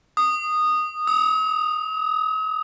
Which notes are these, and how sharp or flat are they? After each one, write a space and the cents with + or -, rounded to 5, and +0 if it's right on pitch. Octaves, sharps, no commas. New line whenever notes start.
D#6 -15
D#6 +45